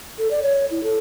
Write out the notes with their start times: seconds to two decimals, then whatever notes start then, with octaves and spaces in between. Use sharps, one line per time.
0.18 A4
0.31 D5
0.42 C#5
0.71 E4
0.83 A4